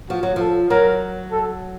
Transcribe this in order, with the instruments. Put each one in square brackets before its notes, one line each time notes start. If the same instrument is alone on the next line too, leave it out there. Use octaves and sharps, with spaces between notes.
[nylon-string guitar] F3 [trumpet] F#4
[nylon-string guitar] F#3
[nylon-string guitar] F3 [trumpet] A4
[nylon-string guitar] F#3 [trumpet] A#4
[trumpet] A4